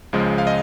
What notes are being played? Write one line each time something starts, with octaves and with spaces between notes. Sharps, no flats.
C#2 C#3 F3 G#3
F5
D#5